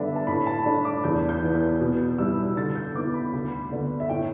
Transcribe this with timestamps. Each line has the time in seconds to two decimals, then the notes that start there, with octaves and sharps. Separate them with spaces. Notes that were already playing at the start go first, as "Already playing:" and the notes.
Already playing: G2 D3 B3 D4 E5 A5
0.16 A5
0.27 A2 B5
0.46 A5
0.66 A3 D4 B5
0.85 D6
1.04 E2 G6
1.29 G6
1.42 E3 B3 E4
1.55 G6
1.80 B2
2.18 G3 E4 E6
2.57 D3 A6
2.76 G6
2.95 B3 E4 D6
3.14 B5
3.33 D2
3.71 D3 B3 D4
4.00 E5
4.09 A2 G5